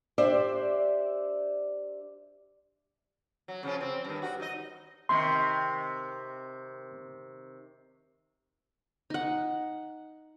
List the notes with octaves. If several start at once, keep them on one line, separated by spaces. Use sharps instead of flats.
D4 G4 C5 D5 E5
F#3
C#3 F3 C#4
C4
G2 D#3
F#4
D#4 D#5
C3 D#3 C6
D#4 F#5